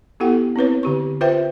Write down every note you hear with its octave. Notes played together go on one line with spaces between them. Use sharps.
B3 E4 G4 A4 F#5 G5
C4 E4 B4 C#5
D3 G4 C#6
F4 B4 C5 E5 G5